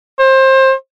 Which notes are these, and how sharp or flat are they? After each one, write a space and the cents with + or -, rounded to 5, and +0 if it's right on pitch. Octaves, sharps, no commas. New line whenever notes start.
C5 +25